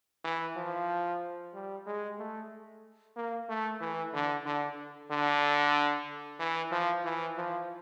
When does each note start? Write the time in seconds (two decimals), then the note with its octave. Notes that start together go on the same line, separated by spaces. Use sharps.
0.25 E3
0.56 F3
1.54 G3
1.86 G#3
2.18 A3
3.17 A#3
3.49 A3
3.81 E3
4.14 D3
4.46 D3
5.11 D3
6.40 E3
6.72 F3
7.05 E3
7.36 F3